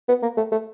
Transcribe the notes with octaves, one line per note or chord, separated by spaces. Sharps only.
B3
A#3
A3
A3